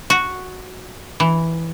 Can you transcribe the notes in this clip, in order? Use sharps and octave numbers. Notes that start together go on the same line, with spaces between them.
F#4
E3